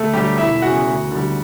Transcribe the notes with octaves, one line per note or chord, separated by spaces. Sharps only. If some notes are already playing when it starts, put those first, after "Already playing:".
Already playing: D2 A3 A4
D3 F#3 G3 G4
E1 E4 E5
E2 C#3 E3 F#4 F#5
D2
D3 G3